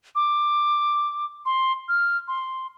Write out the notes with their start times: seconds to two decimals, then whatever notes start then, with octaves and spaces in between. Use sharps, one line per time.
0.15 D6
1.46 C6
1.88 F6
2.28 C6